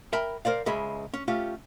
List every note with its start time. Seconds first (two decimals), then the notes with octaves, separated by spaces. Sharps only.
0.13 A#4 E5 G5 A5 B5
0.45 A#4 C5 D5 F5
0.66 C#2 C#3 G#3 G#4 E5 B5
1.14 C#4
1.28 A3 C#4 F4 G4